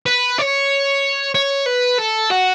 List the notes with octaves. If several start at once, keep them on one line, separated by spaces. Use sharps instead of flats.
B4
C#5
C#5
B4
A4
F#4